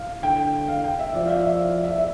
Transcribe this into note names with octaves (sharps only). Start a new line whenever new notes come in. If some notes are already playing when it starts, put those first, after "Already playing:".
Already playing: F5
D3 G5
F5
G5
E5
F3 D5
F5
E5
E5
F5
E5
E5